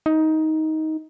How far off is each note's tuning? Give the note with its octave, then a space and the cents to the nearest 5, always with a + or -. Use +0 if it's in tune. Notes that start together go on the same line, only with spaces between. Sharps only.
D#4 +15